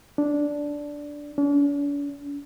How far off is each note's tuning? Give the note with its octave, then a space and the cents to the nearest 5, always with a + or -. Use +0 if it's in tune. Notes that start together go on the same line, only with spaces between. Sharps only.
D4 -5
D4 -45